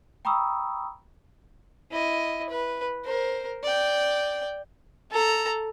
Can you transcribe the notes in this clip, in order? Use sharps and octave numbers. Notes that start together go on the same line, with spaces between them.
G5 A#5 B5 C#6 D#6 E6
E4 D#5
B4
A#4 C5
D5 G5
A4 A#5